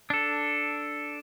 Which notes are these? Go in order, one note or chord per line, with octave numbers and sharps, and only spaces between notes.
D4 A4